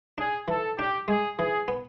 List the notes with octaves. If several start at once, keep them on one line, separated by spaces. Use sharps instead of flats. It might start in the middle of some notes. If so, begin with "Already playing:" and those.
D4 G#4
E3 A4
D4 G4
G#3 G#4
E3 G#4
B3